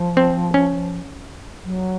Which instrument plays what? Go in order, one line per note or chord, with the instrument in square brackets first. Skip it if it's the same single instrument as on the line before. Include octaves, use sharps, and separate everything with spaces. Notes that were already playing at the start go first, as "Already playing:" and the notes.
Already playing: [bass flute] F3
[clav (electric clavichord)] C4
C#4
[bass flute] F#3